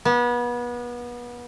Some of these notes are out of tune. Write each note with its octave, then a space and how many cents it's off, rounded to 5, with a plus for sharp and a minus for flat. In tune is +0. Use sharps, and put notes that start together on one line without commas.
B3 -30